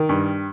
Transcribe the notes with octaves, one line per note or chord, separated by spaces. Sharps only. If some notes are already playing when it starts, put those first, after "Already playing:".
Already playing: D#3
G2